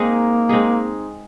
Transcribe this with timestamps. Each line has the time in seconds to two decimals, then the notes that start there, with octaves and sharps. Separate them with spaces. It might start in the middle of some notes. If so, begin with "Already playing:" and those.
Already playing: G#3 A#3 C4 D#4 G#4
0.49 G#3 C4 D#4 G#4